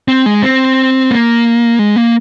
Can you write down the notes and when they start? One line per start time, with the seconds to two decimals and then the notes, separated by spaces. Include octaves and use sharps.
0.08 C4
0.26 G#3
0.43 C4
1.11 A#3
1.79 G#3
1.96 A#3